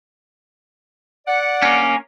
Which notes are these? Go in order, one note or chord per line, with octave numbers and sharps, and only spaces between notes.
D5 F#5
A#3 C#4